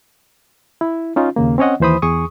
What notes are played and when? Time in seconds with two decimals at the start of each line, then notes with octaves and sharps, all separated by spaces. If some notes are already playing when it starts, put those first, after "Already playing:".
0.81 E4
1.16 C#4 D#4 F4
1.36 D#2 C#3 A#3
1.58 C4 C#4 C#5 D#5 F#5
1.80 D#2 E3 C5 B5 D#6
2.02 E2 G#4 C#6 D#6